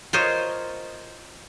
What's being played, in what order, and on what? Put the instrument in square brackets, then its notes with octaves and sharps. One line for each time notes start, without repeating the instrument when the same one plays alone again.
[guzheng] F4 A#4 C5 C#5 D#5